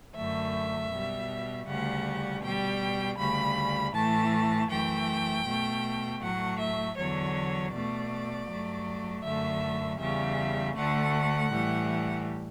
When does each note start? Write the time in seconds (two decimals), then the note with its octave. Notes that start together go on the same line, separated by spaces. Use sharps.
0.15 F#2 D3 A3 E5
0.92 B2 G3
1.67 D2 C#3 G3 F#5
2.42 B2 G3 G5
3.18 D2 C#3 G3 B5
3.94 A2 E3 A3 A5
4.70 F#2 E3 A3 G5
5.46 B2 A3
6.21 A2 F#3 A3 F#5
6.59 E5
6.97 E2 D3 F#3 C#5
7.72 B2 A3 D5
8.48 G2 F#3 A3
9.24 F#2 D3 A3 E5
9.99 E2 C#3 G3 E5
10.75 D2 D3 A3 F#5
11.51 A2 E3 G3